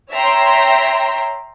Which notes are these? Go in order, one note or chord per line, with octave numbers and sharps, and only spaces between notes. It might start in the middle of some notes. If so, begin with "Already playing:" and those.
C#5 E5 G5 A#5 C6